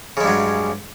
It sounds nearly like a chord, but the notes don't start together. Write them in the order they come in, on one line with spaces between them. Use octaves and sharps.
C#3 G#3 G2 F#3